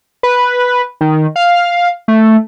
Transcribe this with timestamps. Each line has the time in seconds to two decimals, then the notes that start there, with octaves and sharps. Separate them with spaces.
0.23 B4
1.01 D#3
1.36 F5
2.08 A3